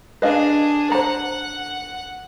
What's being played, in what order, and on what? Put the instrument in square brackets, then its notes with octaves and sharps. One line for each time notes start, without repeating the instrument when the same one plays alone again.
[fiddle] D4 G#4 [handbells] B4 D#5 F5
[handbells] C5 A#5 [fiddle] F#5